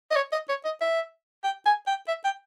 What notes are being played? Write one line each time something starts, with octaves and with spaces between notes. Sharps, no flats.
D#5
C#5
D#5
C#5
D#5
E5
G5
G#5
G5
E5
G5